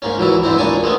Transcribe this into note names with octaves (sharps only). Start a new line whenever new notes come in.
G#2 A#3 C#4
C#2 E3 F#3 E4
G#2 D3 E3 C4 E4
C#2 A#3 D4 C#5 G#5
G#3 A3 B3 C#4